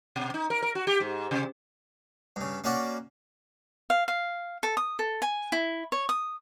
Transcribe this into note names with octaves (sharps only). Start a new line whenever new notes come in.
B2
D#4
A#4
A#4
F#4
G4
G#2
C3
G2 C#3
A#3 C#4 F#4 D5
F5
F5
A4
D#6
A4
G#5
E4
C#5
D#6